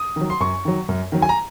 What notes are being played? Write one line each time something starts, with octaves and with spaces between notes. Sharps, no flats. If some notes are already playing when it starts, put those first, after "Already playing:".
Already playing: D#6
D#3 F#3
C6
F#2 C#6
D#3 F#3
F#2
D#3 F#3
G#5
A#5